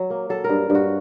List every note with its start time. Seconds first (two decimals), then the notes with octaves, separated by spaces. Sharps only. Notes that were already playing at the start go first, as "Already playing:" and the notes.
Already playing: F#3
0.10 A#3
0.29 F#3 A4
0.44 G2 A#4
0.70 G2 F#4